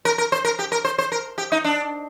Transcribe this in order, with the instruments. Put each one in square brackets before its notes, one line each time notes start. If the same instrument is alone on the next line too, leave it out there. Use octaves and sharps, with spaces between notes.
[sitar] A#4
A#4
C5
A#4
G4
A#4
C5
C5
A#4
G4
D#4
D4